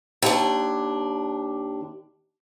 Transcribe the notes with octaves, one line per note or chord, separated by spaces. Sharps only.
D#2 D4